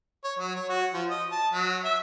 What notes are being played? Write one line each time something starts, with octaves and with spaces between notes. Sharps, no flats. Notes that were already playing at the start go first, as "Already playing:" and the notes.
C#5
F#3
C#5
F#4
F3
D#5
A5
F#3
E5